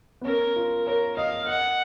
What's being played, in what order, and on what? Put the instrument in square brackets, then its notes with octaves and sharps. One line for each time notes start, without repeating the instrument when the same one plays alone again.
[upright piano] B3
[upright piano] C#4 [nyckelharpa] A#4
[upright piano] F4
[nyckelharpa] A#4 [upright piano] C#5
[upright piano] D#5 [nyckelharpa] F5
[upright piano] D#5 [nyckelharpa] F#5